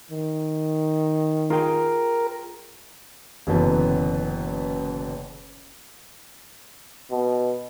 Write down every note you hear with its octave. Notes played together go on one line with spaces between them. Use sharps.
D#3
F4 G#4 A#4 G5
F#1 F#2 B2 D3 E3
B2